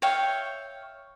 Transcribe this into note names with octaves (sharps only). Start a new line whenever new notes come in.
C#5 E5 F5 G5